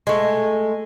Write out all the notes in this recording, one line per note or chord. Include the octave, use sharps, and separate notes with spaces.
G#3 A3